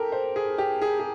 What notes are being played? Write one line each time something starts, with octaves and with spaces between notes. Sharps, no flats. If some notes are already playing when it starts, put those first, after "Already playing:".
Already playing: G4 A4 A#4
C5
G#4
G4
G#4
G#4